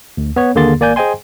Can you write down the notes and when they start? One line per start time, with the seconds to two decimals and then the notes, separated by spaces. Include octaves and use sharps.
0.17 D2
0.36 B3 C#5
0.55 D#2 D3 A#3 G#4 C6 A6
0.80 G#1 A#3 D5 G#5 G6
0.96 G#4 C5 D#5 G5 G#5 C6